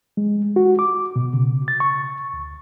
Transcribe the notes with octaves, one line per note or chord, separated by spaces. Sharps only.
G#3
F#4
D6
B2
C#3
A6
C#6
D2